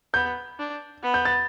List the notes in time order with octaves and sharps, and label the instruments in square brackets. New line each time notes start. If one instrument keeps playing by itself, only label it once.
[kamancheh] B3 [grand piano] G6
[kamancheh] D4
B3
[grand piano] G6
A6